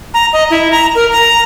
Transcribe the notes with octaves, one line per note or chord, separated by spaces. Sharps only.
A#5
D#5
E4
A#5
A#4
A#5